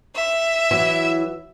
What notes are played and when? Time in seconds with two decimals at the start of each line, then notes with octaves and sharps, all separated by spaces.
0.15 E5
0.71 E3 F#3 E4